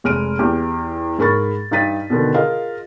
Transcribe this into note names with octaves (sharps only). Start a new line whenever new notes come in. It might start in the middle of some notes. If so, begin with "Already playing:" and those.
F1 G#3 F6 D7 D#7
E2 G4
G#2 G#4 A#4 B5 C#6 A6
G2 D#4 A6 B6 D#7
B2 D3 D#3
F4 G#4 A#4 D#5 F5